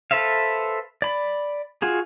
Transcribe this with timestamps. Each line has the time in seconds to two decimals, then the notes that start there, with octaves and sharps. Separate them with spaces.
0.11 A4 B4 C5 E5 F5
1.02 D5 B5
1.82 F4 F#4 G#4